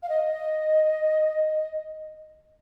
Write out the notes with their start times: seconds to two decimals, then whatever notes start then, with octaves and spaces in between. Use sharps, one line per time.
0.03 F5
0.09 D#5